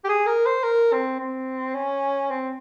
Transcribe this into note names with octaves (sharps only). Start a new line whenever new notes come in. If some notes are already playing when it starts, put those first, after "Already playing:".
G4
G#4
A#4
C5
A#4
C4
C4
C#4
C4